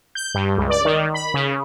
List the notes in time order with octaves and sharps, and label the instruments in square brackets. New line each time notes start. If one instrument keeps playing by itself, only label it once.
[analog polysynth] G6
G2
C#2
D5
D#3
B5
C#3